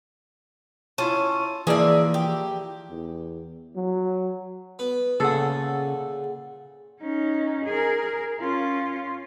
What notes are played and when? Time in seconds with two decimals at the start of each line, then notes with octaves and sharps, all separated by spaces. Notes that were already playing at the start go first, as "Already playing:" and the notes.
0.98 C#4 E4 F4 A5
1.67 E3 F3 A#3 G#4 D5 E5
2.14 G4
2.89 E2
3.76 F#3
4.79 B3
5.20 A#2 C#3 G#4 A4 F#5
7.01 C#4 D#4
7.66 G#4 A#4
8.40 C#4 F4